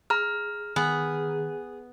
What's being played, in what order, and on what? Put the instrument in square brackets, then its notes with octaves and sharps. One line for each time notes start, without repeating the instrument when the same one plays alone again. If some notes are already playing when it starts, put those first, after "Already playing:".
[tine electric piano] G#4 [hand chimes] A#5 F6
[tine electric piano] D#3 [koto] B3 [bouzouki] G#4